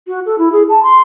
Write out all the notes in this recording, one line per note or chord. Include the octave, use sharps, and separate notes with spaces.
F#4
A4
E4
G#4
A5
C6